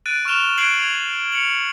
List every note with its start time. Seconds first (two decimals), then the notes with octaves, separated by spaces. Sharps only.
0.06 F#6 A6 D7 D#7
0.25 C#6 F6 F#6 E7 F7 G7
0.58 F#6 G#6 C7 D7 F#7
0.79 G#6 F7
1.32 C#7 F7 F#7